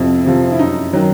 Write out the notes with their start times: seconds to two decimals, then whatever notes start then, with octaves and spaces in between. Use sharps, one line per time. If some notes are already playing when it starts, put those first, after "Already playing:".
Already playing: F2 C3 F3 E4
0.26 C3 F3
0.52 E4
0.59 F#2 D#4
0.93 D#3 F#3